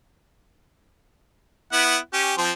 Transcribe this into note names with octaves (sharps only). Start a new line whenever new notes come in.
B3 E4 F#5
C#4 G4
F3 C4